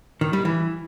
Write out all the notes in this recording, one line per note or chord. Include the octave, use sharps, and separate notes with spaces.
D#3
G3
E3